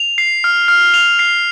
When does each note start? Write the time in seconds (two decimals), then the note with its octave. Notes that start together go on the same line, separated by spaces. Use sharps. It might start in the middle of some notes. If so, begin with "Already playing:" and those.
Already playing: F7
0.18 C7
0.44 F6
0.68 F6
0.94 F7
1.19 C7